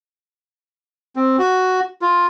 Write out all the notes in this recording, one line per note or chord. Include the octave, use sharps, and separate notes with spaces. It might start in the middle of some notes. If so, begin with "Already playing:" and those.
C4
F#4
F4